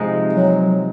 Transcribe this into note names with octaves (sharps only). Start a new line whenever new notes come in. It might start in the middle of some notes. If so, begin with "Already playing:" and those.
Already playing: C3 F3 G#3 D#4
F#3